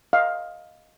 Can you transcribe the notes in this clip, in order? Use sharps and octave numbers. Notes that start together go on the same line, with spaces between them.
D#5 F5